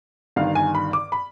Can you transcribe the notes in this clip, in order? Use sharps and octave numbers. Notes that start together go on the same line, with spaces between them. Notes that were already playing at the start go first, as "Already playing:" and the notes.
G1 G2 D#3 F5
G#5
B5
D6
B5